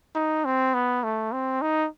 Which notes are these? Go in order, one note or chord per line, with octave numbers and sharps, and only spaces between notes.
D#4
C4
B3
A3
C4
D#4